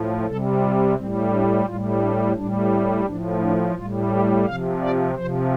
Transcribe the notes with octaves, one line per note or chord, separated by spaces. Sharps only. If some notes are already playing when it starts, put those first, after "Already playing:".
Already playing: A2 F3
C3 G3 A4
F4
A2 G3 C4
D4
A2 G3 F4
D4
A2 G3 D4
C4
A2 F3 D4
D4
A2 G3 F4
G4
C3 F3 F5
D5
C3 F3 C5